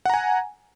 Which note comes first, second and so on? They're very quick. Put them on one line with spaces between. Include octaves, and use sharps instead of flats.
F#5 A#5 G#5